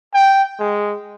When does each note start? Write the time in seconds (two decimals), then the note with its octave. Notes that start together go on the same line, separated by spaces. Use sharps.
0.14 G5
0.59 G#3